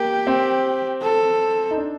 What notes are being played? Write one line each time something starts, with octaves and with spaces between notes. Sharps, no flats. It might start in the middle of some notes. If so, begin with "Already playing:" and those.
Already playing: A#3 G4
C4
A4
D#4
D4